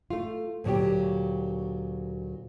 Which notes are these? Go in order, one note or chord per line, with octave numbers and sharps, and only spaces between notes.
A3 F4
D2 A#2 F#3 A#3 G4